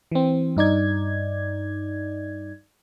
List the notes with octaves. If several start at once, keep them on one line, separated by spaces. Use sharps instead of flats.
E3 C4
G2 D#4 D5 G#6